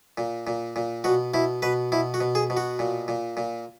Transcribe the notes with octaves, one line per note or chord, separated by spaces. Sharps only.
A#2
A#2
A#2
B2 F#4
B2 E4
B2 B4
B2 E4
F#4
B2
G#4
B2
F#4
A#2
A#2
A#2